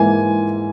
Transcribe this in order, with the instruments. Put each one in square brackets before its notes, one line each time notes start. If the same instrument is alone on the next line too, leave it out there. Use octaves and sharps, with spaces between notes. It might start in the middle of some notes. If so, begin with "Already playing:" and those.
Already playing: [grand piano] G#2 E3 A#3 G#5